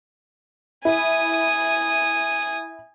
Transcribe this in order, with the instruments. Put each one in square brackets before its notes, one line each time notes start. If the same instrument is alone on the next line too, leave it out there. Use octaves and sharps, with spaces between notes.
[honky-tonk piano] E4 [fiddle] G#5 D#6